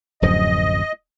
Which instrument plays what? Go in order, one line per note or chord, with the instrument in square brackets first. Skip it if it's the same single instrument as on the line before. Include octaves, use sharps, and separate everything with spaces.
[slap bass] D1 F#2 F3 [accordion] D#5